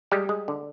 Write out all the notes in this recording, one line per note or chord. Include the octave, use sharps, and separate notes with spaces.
G3 G#3 G4
G#3
D3